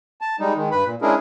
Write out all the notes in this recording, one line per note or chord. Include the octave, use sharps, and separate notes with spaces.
A5
G3 G#3 D#4
D#3 G#3
G2 B4 B5
A#2
G#3 C#4 D4 E4 G#4 A#4